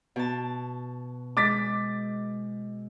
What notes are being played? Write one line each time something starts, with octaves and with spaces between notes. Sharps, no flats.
B2 A5
G#3 D6 A6 B6